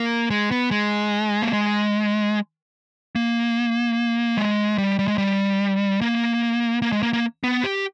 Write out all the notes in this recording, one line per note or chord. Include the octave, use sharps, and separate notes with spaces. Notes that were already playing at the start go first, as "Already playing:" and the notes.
Already playing: A#3
G#3
B3
G#3
A#3
G#3
A#3
G#3
G3
G3
G#3
G3
A#3
A#3
G#3
A#3
A#3
B3
G4